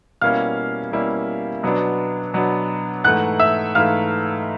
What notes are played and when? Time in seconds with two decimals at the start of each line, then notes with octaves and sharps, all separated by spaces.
0.21 B2 G3 A#3 C#4 E4 F5 F6
0.92 B2 G3 A#3 C#4 E4
1.63 B2 F#3 B3 D4
2.34 B2 F#3 B3 D4
3.04 G#2 E3 A3 F#5 F#6
3.40 E5 E6
3.75 G#2 E3 A3 F5 F6